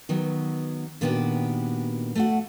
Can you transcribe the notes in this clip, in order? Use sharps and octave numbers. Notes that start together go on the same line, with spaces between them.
D#3 F#3 B3
A#2 D#3 B3 D4 F#4 G4
A3 F#4 F#5